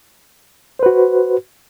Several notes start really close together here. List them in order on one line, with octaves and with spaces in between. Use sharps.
C5 B4 F#4